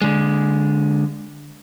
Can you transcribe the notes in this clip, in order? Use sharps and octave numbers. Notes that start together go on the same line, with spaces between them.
D3 G#3